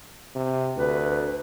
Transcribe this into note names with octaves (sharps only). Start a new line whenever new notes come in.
C3
D2 B4